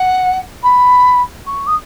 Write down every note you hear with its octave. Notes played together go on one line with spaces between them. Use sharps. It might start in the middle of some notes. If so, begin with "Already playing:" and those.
Already playing: F#5
B5
C#6
D#6